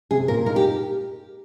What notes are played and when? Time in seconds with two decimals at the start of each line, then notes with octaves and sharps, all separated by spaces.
0.11 C3 G#4
0.28 A#2 A#4
0.46 D#4 A#4
0.56 G4